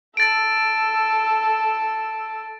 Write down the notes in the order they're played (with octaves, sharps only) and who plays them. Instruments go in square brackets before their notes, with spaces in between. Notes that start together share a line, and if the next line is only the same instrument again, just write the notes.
[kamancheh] A4 E6 [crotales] A6 D7